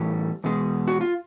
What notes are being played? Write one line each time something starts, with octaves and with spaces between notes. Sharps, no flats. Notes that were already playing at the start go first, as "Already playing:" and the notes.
Already playing: A2 E3 G3
E2 B2 G#3
F#4
F4